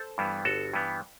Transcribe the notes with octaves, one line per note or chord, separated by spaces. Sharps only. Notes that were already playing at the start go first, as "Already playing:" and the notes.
Already playing: A4 C5
G2 E3 G3 B3
G1 F#4 A4
G2 E3 G3 B3